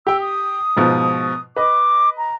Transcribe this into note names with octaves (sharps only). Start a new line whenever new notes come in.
G4 G5 E6
D#6
G#2 B2 F3
B4 D#5 D6
A#5